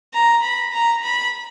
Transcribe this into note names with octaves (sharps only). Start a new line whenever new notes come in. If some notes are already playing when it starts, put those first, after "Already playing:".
A#5
B5
A#5
B5